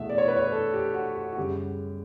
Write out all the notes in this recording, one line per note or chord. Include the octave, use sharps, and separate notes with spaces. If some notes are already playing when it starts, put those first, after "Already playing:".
Already playing: E2 B2 A3 E5
D5
C#5
B4
C#5
A4
G4
F#4
F#4
F#4
F#2 C#3 G3 G4